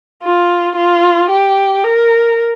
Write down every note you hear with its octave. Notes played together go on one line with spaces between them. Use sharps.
F4
F4
G4
A#4